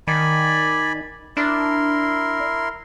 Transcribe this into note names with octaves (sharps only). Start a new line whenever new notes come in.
D#3 D5 G#5 B5
D4 E4 A#4 C6